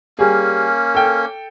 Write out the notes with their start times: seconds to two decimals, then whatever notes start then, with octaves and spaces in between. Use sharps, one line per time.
0.19 G3 A#3 C#4 G#4
0.95 A4 G5